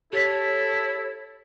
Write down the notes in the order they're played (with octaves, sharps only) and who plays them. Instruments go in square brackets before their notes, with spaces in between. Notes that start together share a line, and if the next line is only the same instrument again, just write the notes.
[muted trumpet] E4 [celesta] G4 B6 [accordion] A4 [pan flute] C#5